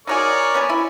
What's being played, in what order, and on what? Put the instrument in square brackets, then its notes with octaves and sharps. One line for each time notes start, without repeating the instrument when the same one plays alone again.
[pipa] D#4 F#4 G#4 [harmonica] A#4 C#5 D5
[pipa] B3 C#4 G#4
E4